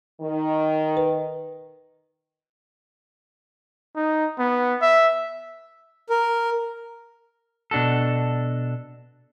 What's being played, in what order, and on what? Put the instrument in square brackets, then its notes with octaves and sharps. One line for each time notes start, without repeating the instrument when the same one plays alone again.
[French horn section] D#3
[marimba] B4
[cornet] D#4
B3
E5
[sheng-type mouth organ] A#4
[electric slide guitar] B2 D4 F#4 A4